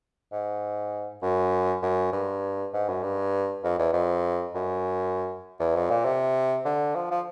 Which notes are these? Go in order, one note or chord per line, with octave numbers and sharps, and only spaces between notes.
G#2
F#2
F#2
G2
G#2
F#2
G2
F2
E2
F2
F#2
E2
F2
A#2
C3
D3
F3
F3